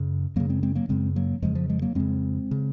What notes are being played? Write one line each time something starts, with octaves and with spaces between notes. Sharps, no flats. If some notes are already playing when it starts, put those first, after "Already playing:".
Already playing: F#2 C#3
F#2 C#3 F#3 A#3
G#3 C4
G#3 C4
F#3 A#3
F#2 C#3 G#3 C4
F#3 A#3
F2 C#3 F3 G#3
F3
F3 G#3
F#3 A#3
F2 C#3 G#3 C4
C#3